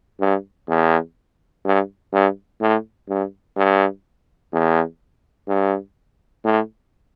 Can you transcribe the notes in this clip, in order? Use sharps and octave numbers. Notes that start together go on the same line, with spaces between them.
G2
E2
G2
G2
A2
G2
G2
E2
G2
A2